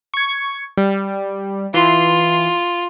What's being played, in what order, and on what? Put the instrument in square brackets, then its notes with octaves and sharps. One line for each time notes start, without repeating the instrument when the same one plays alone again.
[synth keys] C#6 G#6
G3
[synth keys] E3 C6 [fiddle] F4